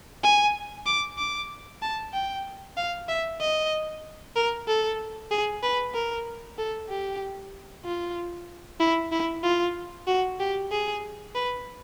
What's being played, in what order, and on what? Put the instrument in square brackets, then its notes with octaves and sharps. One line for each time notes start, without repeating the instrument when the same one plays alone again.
[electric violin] G#5
D6
D6
A5
G5
F5
E5
D#5
A#4
A4
G#4
B4
A#4
A4
G4
F4
E4
E4
F4
F#4
G4
G#4
B4